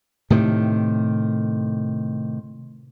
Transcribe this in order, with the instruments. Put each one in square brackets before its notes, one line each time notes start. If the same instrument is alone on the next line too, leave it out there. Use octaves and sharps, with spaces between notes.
[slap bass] A2 C3 D#3